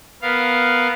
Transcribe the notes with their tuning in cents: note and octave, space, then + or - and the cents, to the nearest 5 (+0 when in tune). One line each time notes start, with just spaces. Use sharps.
B3 +0 A#4 +0 F5 +0